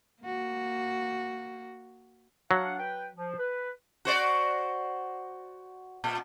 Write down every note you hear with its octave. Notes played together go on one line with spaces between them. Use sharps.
A#3 F#4
F#3 D4 F5 F#5
B4 G5
F3
B4
F#4 C5 D5
A#2